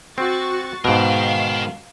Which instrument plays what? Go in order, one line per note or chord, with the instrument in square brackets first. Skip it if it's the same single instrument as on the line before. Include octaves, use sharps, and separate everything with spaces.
[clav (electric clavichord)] C4 [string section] F#4 C#6 A6
[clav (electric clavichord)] G#2 B2 [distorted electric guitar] A#4 G5 [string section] F5 C7